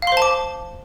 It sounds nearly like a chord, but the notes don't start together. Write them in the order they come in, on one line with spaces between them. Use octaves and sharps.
F5 C6 C5 A5 D6